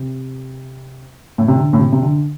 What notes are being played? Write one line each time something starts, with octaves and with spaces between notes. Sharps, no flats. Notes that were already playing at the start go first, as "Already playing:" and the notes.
Already playing: C3
A2
C3
D3
A2
C3
C3
D3